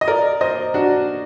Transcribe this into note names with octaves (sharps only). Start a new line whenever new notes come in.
D#5
A#4 D5
C5 D#5
D4 F#4